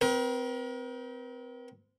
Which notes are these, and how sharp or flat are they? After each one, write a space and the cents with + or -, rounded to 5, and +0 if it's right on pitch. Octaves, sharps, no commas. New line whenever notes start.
C4 -25 A#4 +45